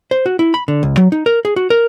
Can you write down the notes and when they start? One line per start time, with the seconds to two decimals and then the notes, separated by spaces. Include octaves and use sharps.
0.11 C5
0.26 F#4
0.39 E4
0.54 B5
0.68 D3
0.83 C#2
0.97 F#3
1.12 D#4
1.26 A#4
1.45 G#4
1.56 F#4
1.70 A#4